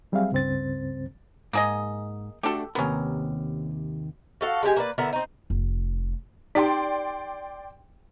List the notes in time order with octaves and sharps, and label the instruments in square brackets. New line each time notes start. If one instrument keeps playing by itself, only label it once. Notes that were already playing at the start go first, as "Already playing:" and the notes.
[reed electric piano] F#3 G3 C4 G#4 E5 F5
C#2 G2 C#3 C4 C5 A6
[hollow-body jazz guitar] G#2 [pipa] A#3 G#4 D#5
[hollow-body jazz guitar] A3 D4 F#4 [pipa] G4 A4
[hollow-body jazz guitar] D#2 C3 A#4 [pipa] B3 C#4
[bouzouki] F#4 A4 F5
G#3 D4 G4 G#5
A#3 B4 D5
D3 B3 E4 A#4
C4 D#4
[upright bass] F1
[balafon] D#4 G4 [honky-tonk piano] D5 G5 C6